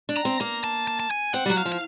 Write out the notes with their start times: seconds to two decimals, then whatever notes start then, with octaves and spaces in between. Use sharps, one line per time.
0.09 D4
0.17 A#5
0.25 C4
0.40 A#3 A#5
0.64 A5
0.87 A5
1.00 A5
1.11 G#5
1.34 C4 F#5
1.46 G3
1.50 F#3
1.58 F5
1.65 F3
1.72 F5